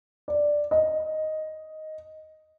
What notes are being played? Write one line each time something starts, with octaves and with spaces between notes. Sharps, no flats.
D5
D#5